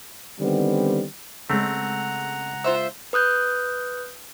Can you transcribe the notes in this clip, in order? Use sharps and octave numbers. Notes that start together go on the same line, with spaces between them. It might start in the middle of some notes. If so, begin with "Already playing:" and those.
D3 D#3 G3 B3 C4
C#3 G#3 A3 C4 F#5 A#5
F4 C5 E5
B4 D#6 F#6 G6